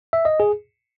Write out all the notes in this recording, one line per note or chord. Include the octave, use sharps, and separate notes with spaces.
E5
D#5
G#4